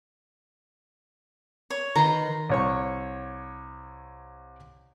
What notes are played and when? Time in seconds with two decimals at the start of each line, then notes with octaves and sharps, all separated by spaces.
1.70 C#5
1.96 D#3 B4 A#5 C6
2.50 C2 C#5 C#6